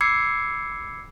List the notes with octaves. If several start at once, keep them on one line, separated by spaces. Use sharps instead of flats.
B5 D6 E6 G#6 C7 C#7